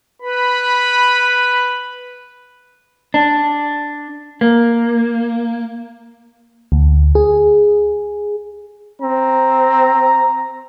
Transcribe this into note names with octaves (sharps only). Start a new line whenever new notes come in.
B4 B5
D4
A#3
D2
G#4
C4 A#5